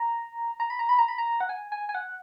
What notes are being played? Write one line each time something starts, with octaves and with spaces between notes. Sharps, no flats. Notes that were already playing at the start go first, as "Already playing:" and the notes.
Already playing: A#5
A#5
B5
A#5
B5
A#5
B5
A#5
F#5
G#5
G#5
G#5
F#5